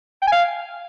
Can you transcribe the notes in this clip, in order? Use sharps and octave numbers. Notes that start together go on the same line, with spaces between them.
G5
G#5
F5